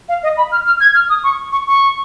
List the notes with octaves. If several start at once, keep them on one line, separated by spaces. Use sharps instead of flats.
F5
D#5
B5
F6
F6
G#6
F6
D#6
C#6
C#6
C#6